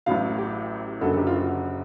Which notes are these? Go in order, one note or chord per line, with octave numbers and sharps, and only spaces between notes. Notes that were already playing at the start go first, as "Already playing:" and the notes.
A1 A2 F#3 F5
G4
F#1 F#2 D3 F#3 A4
G4
F4
F#4